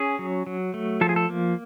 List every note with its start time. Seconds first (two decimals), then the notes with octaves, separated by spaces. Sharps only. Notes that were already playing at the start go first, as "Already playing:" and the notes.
Already playing: C#4 G#4
0.19 F#3
0.46 F#3
0.74 A3
1.01 F3 A4
1.09 G#4
1.16 A4
1.29 A#3